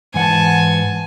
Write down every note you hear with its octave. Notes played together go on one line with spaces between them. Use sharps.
G#2 E3 F#5 G#5 A5